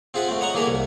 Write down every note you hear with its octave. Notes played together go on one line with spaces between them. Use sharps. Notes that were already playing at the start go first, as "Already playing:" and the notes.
C4 F4 G#4 E5 F#5
A3 C4
C#5 D#5 F#5 A#5 C#6
E3 A#3 G#4 A4 E5
C2